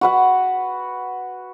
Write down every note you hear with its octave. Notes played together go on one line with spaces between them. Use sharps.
F#4 B4 F#5